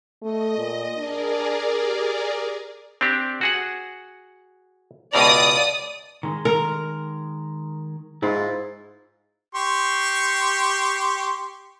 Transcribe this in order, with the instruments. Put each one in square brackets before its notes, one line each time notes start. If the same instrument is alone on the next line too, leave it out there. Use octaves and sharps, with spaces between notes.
[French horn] A3 [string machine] D#5
[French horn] A#2
[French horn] D4 [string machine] G#4 A#4 D5
[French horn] G4
[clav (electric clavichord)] C4 D4 G4
F#4 G#4 F#5
[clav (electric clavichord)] C#2 B2 A#5 [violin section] D5 D#6
[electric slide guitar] D#3 G#3
[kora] A#4
[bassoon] G#2 [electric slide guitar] E4 F4
[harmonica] G4 C6 C#6